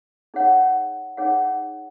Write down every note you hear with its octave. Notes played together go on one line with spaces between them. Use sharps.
D#4 G#4 C#5 F#5
D#4 G#4 C#5 F#5